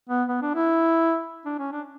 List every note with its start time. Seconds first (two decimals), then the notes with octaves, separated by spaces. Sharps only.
0.09 B3
0.29 B3
0.42 D4
0.55 E4
1.46 D4
1.59 C#4
1.72 D4